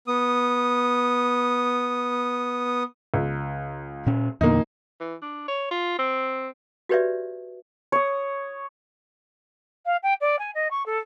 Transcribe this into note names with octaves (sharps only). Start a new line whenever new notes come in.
B3 D#6
C#2
A#2 C#4
E2 A#2 D3 A#3 D#4
E3
D4
C#5
F4
C4
F#4 G4 B4 C#5 D5 E5
C#5 D#6
F5
G5
D5
G#5
D#5
C#6
A4